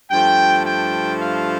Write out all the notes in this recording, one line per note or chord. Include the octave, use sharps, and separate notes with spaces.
G2 F3 A3 G5
G5
F5